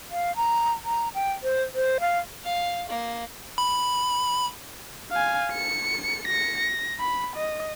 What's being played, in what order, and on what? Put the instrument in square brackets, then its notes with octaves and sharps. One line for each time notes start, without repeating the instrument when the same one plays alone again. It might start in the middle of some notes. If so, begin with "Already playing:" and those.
[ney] F5
A#5
A#5
G5
C5
C5
F5
[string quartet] F5
A#3
[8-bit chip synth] B5
[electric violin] F5 G#5
C#7
A#6 C#7
A#6
B5
D#5